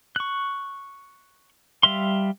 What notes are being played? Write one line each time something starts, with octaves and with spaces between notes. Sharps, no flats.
C#6 F#6
G3 E5 F5 C6